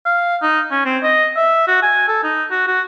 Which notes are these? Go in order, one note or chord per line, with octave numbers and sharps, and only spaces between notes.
F5
D#4
C#4
C4
D#5
E5
F#4
G#5
A4
D#4
F#4
F#4